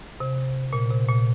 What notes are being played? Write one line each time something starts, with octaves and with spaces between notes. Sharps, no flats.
C3
A#2
C3
A#2